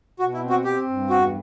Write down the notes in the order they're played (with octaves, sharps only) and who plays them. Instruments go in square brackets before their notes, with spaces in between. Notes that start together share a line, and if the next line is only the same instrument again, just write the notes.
[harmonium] B2 [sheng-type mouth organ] F#4
[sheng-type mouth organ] E4
[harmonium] C4
[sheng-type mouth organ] F#4
[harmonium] C4 [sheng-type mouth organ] G4
[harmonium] G2
[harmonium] E2 [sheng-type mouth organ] F#4